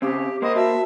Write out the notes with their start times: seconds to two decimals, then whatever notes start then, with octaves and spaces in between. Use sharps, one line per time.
0.02 C#3 C4 G4
0.42 A#3 C5 D#5
0.55 F#4 E5 A5